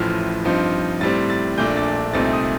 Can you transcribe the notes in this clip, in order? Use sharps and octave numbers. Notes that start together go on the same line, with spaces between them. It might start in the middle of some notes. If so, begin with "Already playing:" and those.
Already playing: A1 A2 F3 F6
G2 F3 C4 D#4
A2 G3 C4 A6
A6
A#1 A#2 A3 D4 G6
A6
C2 A#2 A3 C4 D#4 A6
D#6